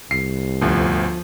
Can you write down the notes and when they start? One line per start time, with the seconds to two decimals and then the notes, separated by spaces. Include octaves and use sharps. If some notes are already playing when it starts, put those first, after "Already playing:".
0.11 C2 C7
0.61 G1 D2 F3